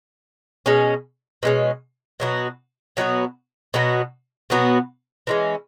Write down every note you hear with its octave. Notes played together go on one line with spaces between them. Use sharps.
B2 G#3 C#4
B2 G#3 C#4
B2 F#3 B3 F#4
B2 F#3 B3 F#4
B2 F#3 B3 F#4
B2 F#3 B3 F#4
E3 G#3 C#4